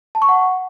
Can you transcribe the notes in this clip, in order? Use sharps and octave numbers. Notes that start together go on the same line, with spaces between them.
A5
C#6
F#5